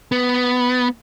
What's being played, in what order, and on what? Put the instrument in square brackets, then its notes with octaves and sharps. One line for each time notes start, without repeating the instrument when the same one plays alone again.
[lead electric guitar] B3